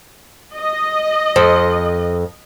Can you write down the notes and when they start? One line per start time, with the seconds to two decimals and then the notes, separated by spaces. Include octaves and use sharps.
0.56 D#5
1.36 F2 C5